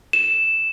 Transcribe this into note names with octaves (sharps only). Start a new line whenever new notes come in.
E7